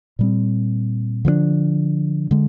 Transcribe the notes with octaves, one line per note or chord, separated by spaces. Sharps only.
A#2 G3 C4
D3 F3 A#3 D4
D3 G#3